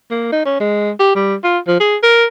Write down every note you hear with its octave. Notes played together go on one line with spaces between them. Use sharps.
A#3
D#4
C#4
G#3
G4
G3
F4
F3
G#4
A#4